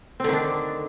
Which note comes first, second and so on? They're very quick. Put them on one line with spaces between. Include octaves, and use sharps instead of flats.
C4 D3 D#3 D4